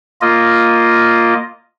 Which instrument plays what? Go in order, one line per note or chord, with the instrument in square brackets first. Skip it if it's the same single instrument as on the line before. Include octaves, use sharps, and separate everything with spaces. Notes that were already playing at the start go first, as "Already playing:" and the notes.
[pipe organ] A#3 F4 D#5